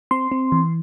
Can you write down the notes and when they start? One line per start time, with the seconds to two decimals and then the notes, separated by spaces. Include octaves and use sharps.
0.11 C4 C6
0.32 C4
0.52 E3